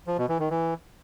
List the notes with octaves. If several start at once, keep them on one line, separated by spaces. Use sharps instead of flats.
F3
B2
E3
D#3
E3